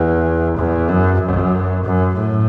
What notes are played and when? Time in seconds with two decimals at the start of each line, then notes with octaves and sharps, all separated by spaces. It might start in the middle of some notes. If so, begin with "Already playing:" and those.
Already playing: E2
0.57 E2
0.89 F#2
1.20 F#2
1.85 F#2
2.16 A2